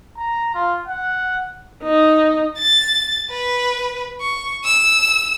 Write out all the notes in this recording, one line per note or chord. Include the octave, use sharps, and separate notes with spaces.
A#5
F4
F#5
D#4
A6
B4
C#6
E6